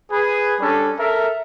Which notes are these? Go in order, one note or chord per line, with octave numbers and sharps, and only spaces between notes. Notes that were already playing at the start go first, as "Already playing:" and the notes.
G#4 B4
G3 C#4 D4 A4
A4 A#4 E5